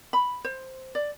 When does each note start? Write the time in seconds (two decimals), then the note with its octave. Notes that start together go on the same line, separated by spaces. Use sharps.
0.13 B5
0.44 C5
0.95 D5